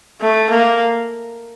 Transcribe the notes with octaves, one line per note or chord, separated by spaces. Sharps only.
A3
A#3